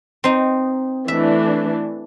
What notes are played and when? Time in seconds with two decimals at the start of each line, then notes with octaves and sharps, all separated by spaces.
0.24 C4 D#4
1.08 E3 A3 D4 E5